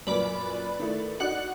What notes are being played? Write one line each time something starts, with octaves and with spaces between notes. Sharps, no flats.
F#2 A#2 B4 D5 B5
D#3 A3 E4
D4 D#4 F#4 D5 F#5 F#6